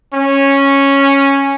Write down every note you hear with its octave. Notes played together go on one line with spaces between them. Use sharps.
C#4